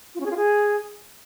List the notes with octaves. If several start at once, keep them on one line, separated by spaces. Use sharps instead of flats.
F4
C#4
G#4
F4
G#4